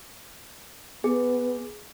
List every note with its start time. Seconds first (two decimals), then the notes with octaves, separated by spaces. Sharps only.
1.04 B3 G#4